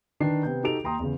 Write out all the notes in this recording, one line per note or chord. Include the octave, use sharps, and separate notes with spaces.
D#3 D4 B4 C7
C3 B3 G6
D#4 F#4 G4 A4 D7 F7
D#2 G5 A#5 C6 D#6
E2 C#3